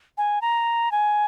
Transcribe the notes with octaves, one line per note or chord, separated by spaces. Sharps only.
G#5
A#5
G#5